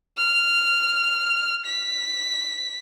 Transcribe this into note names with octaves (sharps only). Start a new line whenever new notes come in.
F6
B6